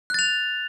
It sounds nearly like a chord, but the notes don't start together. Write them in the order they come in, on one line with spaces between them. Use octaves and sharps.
F#6 A6 F7